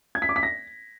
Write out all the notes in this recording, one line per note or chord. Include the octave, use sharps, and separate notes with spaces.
G#6
B6
D6
B6
A#6